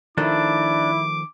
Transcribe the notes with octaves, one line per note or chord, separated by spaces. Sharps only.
D#3 F3 A3 D4 E4 D6